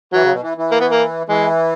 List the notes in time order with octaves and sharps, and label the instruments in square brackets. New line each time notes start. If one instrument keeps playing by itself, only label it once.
[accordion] E3 [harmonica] F#3
[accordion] C#3
B2
E3
E3
[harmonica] A#3
B3
A#3
[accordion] E3 [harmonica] G#3